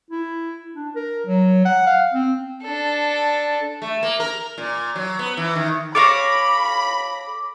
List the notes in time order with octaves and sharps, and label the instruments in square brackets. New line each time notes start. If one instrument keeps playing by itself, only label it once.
[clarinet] E4
D4
A#4
F#3
F#5
F5
C4
[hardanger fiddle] D4 A4
[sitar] A3
A#3
A#4
A#2
F#3
B3
E3
D#3
[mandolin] A4 C#5 F5 [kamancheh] B5 [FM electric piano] D6 A#6